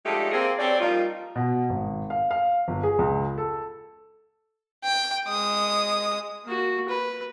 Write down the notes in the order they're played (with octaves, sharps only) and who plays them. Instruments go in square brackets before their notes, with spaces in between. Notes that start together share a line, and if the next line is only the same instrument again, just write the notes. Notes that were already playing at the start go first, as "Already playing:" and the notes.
[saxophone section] F3 G#3 A3 D4 D#4 G4
A#3 C4 G#4
C4 G4 A4 C#5 D5
F3 G3 A#3 D#4 F4
[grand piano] B2
G#1
F5
F5
G1
G#4
C#2
A4
[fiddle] G5
G#3 D#6
[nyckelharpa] A#3 F#4
B4